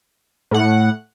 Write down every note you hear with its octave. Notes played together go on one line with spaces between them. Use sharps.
A2 F#5